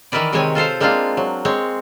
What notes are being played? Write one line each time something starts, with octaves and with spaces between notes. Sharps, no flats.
D#3 E3 E4 A#4 B4 D5
C3 D#3 G#3 C4 C#5 G#5
F4 A4 C5 F5
G#3 A#3 C4 D4 F4 F5
F#3
G#3 C4 C#5